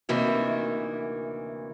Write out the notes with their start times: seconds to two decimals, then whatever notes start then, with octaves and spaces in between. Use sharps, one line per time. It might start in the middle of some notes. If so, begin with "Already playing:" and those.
0.09 D2 C3 D#3 E3 A#3 F#4